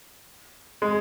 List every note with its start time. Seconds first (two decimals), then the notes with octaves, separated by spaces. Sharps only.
0.82 G#3